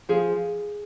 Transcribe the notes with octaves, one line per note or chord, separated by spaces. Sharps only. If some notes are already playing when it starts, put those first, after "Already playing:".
F3 G#4